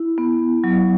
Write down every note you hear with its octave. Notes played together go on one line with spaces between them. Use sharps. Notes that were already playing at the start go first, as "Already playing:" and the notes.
Already playing: E4
B3
F#3